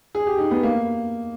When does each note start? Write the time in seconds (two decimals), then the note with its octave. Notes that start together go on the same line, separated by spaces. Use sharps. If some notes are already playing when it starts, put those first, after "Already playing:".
0.15 G#4
0.27 G4
0.38 D#4
0.51 B3
0.63 A#3